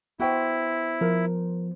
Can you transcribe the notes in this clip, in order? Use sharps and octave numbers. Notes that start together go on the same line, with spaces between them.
B3 E4 F#4 B4 C5 G5
F3 A#4